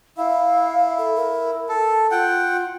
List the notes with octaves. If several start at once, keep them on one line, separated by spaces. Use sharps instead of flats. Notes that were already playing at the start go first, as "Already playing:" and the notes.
E4 F5
A4
A#4
A4
F4 F#5 G5